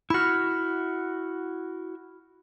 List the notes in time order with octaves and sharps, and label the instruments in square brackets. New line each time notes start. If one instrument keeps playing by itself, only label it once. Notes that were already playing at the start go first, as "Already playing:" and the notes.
[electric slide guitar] E4 F#4 [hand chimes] B5 F6